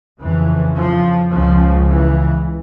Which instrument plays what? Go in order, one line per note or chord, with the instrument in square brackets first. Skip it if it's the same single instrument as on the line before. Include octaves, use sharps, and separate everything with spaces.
[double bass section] F2 C#3 E3
F3
C#2 C#3 F3
E3